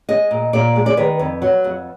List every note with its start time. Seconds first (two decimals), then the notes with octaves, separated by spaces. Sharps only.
0.09 G#3 D#5
0.31 A#2
0.53 A#2 D5
0.76 G#3
0.86 D5
0.97 D#3 B4
1.19 F2
1.42 F#3
1.64 F2